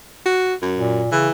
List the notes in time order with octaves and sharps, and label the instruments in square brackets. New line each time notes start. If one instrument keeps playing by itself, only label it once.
[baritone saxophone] F#4
F#2
[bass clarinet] A#2
[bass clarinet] C#3 [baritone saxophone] E3